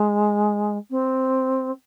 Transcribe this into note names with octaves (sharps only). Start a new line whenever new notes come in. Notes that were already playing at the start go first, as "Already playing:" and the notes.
Already playing: G#3
C4